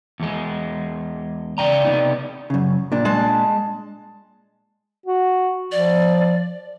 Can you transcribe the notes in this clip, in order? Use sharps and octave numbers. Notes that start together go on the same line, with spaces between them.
E2 G#3
C#3 D5 G5 A#5
C3 B3 D#4
F#2 C#3
A#2 D4
G#3 A5
F#4
F3 D5